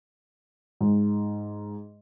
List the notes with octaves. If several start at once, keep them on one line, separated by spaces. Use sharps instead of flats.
G#2